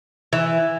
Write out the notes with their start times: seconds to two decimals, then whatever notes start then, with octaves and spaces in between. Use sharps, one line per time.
0.33 E3